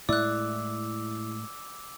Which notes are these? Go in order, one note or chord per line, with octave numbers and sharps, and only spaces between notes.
A2 G#3 E4 D5 D6 E6 F#6